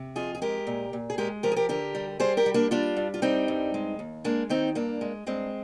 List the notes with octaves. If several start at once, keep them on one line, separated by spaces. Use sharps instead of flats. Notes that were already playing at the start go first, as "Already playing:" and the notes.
Already playing: C3
F2 F4 G#4
G#4
G#3 G4 A#4
A#2
A#2
G#4
G#3 G4 A#4
F3 G4 A#4
G#4
G4 A#4
D3 G4 A#4
G3
G3 G#4 C5
G4 A#4
G3
A#3 D4
G3 D4 F4
G2
F4
G3 C4 D#4
G2
G#3
D#2
G#3 A#3 D4
D#3 C4 D#4
G2 A#3 D4
G#3
G2 G#3 C4